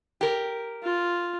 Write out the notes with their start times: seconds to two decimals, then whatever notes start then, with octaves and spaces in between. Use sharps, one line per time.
0.21 G4 A#4
0.83 F4